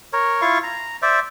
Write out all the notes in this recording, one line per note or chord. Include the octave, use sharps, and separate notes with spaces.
A#4 C#5
E4 F4 F5 C#6
A#5
C5 D5 E5